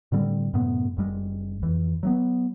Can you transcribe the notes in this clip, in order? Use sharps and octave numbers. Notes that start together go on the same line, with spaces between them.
A2 D3 G3 C4
F#2 A2 C3 B3
F#1 F#2 G3 G#3
F2 E3
F#3 A3 B3